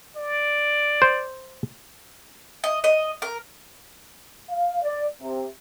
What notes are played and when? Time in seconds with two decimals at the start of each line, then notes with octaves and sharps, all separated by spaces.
0.17 D5
1.02 C5
2.64 D#5
2.84 D#5
3.22 A#4
4.50 F5
4.83 D5
5.22 C3